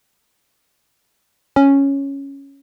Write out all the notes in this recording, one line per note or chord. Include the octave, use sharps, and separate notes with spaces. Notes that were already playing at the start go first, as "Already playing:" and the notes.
C#4